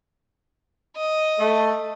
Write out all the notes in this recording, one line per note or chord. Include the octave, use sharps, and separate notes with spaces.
D#5
A3